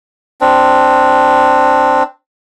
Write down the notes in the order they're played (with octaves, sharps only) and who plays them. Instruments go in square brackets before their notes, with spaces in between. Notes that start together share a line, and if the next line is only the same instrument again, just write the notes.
[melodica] C4 D4